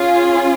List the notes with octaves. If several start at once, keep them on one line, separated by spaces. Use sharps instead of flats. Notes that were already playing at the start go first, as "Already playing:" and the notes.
Already playing: C#4 F4 G#4